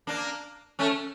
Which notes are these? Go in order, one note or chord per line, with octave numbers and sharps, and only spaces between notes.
A#3 D4
A3 C#4